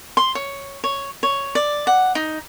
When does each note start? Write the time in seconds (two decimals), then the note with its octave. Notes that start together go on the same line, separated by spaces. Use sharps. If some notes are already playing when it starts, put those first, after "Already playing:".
0.17 C6
0.35 C#5
0.84 C#5
1.23 C#5
1.55 D5
1.87 F#5
2.15 D#4